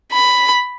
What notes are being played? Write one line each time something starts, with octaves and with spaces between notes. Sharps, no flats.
B5